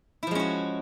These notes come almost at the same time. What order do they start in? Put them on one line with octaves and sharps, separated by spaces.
E4 F3 G#3 C#4 F#4